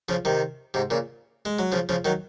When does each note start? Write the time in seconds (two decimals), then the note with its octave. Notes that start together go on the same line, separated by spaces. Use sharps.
0.09 C#3 F3
0.25 C3 D#3
0.74 G#2 C3
0.90 A#2 C#3
1.45 G#3
1.59 F#3
1.72 C#3 F3
1.89 C#3 F3
2.05 D#3 F#3